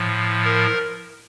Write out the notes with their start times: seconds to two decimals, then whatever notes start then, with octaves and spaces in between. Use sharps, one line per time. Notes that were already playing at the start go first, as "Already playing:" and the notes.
Already playing: A2 F3
0.45 A#4